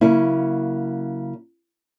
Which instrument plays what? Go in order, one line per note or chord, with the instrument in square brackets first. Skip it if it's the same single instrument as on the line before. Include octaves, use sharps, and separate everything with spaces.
[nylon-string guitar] C#3 F#3 A#3 C#4 E4